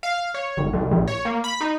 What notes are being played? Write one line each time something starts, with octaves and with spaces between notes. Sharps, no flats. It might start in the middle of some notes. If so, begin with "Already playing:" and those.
F5
C#5
G#1
C2
A#1
C#5
A#3
B5
D#4